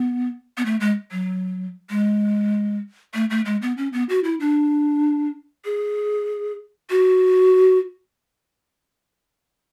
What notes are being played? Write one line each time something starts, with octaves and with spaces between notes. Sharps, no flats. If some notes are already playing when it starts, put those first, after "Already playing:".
Already playing: B3
B3
A3
G#3
F#3
G#3
A3
A3
G#3
B3
C#4
B3
F#4
E4
D4
G#4
F#4